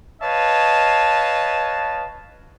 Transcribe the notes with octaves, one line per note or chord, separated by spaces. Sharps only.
B4 C#5 D#5 F5 A5